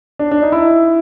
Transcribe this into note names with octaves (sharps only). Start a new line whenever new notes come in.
D4
D4
D#4
E4